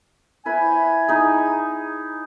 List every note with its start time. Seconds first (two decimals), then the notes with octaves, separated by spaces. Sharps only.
0.46 E4 B4 C5 G#5
1.09 D#4 G#4